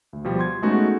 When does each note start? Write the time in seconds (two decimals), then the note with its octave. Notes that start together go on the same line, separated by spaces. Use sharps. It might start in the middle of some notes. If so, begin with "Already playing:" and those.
0.13 D2
0.24 B2 F3 G3
0.39 C6 G#6
0.62 G#3 A3 B3 C#4 D#4 F#4